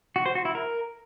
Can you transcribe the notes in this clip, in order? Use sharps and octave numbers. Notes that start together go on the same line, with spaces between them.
F#4
C5
F#4
E4
A#4